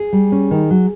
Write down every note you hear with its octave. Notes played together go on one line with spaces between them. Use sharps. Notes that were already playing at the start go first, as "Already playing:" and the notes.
Already playing: G#4
G3
C#4
D#3
F#3